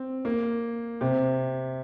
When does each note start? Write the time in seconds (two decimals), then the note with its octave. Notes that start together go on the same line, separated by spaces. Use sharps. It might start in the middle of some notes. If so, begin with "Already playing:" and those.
Already playing: C4
0.25 A#3
1.01 C3